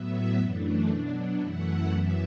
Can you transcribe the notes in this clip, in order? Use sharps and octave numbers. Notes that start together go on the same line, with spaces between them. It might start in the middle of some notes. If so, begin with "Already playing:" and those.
Already playing: A2 F#3 B3 E5
F#2 E3 A3 D4
B2 F#3 D4
F#2 E3 A3 E4 F#5
F#2 E3 B3 E5